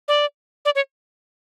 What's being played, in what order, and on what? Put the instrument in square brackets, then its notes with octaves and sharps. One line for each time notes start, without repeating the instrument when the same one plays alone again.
[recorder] D5
D5
C#5